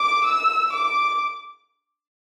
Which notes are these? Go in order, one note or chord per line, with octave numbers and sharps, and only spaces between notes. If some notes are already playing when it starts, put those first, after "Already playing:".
Already playing: D6
E6
D6